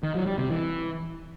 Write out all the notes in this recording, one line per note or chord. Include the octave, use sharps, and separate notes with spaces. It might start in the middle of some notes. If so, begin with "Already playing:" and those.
D#3
F#3
G3
C3
E3